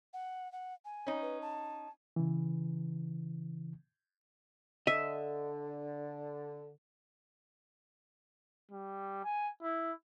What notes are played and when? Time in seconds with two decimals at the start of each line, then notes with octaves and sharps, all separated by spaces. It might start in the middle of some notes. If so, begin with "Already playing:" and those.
0.13 F#5
0.52 F#5
0.85 G#5
1.07 C#4 D#4
1.22 B4
1.42 A5
2.16 C#3 E3
4.87 D3 D#5 E5
8.71 G3
9.24 G#5
9.62 E4